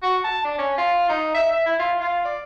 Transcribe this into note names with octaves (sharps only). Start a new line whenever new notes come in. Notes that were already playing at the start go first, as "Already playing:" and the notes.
F#4
A5
D4
C#4
F4
D#4
E5
E5
E4
F4
F4
D5